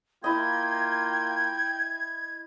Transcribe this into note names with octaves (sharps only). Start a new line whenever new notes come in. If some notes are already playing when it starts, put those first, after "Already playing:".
A#3 E4 F4 D#5 G5 G#6